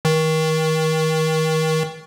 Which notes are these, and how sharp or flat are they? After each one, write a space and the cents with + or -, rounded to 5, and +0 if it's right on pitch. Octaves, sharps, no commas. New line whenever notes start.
D#3 +30